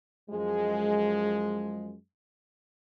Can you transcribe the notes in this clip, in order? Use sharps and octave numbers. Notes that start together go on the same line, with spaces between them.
F#2 F3 G#3